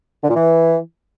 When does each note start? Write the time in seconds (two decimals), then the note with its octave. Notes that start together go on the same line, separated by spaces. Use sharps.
0.22 D3
0.28 A#2
0.35 E3